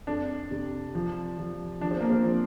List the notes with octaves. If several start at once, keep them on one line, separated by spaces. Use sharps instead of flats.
F2 D4
C3
F3
F3
F3 D4
C4
A#3
C4
F3